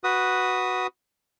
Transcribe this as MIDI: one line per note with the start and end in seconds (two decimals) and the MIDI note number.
0.04 0.87 66
0.04 0.87 71
0.04 0.87 87